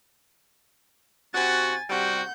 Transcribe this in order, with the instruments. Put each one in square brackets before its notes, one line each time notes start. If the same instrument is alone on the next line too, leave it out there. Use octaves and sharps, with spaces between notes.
[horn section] C3 F#4 [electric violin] G#5 A6
[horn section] C3 G3 F#4 [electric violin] F#5 G6